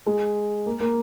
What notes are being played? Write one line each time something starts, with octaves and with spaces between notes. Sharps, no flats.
G#3
A#3
A#3